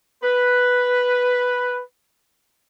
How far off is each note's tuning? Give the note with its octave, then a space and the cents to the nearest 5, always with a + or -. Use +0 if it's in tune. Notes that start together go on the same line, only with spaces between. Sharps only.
B4 +0